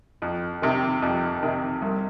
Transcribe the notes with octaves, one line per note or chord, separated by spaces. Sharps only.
F2
C3 D#3
F2
C3 D#3
C2